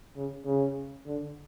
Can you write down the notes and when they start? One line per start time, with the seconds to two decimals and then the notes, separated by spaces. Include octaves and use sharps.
0.16 C#3
0.45 C#3
1.06 D3